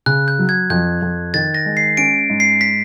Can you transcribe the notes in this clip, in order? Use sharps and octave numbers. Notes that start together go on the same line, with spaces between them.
C#3 F#6
G6
F#3
G#6
F2 G6
F2
D#3 A6
A#6
G#3
C7
C#4 D7
G#2
C7
B6